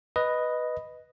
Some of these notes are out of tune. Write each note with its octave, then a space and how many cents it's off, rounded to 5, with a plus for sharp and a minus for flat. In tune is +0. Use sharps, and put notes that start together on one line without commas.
B4 +0 D#5 +0